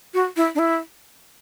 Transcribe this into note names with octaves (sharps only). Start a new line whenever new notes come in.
F#4
E4
D4
E4